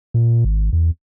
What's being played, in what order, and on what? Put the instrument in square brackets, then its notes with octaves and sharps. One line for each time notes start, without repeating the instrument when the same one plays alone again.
[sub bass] A#2
G#1
E2